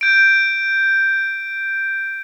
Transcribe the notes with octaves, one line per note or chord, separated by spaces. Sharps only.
G6 D7